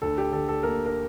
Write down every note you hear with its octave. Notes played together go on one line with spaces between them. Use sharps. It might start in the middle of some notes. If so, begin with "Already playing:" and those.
D2 A4
G4
D3 A4
A4
A#3 A#4
A#4